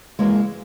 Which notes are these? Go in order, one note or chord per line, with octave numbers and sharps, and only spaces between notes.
F#2 C#3 E3 G#3 A#3